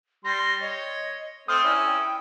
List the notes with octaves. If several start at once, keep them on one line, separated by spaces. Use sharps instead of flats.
G3 C6 A#6
C#5 D#5
A3 C4 C5 D#6 F6
C#4 E4 D5
G5